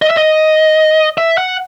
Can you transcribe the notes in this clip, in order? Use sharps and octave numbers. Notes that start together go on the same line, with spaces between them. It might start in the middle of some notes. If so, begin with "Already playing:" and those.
D#5
E5
D#5
E5
F#5